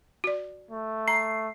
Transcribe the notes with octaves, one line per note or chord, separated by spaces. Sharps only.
F#4 D5
A3
A#5 C7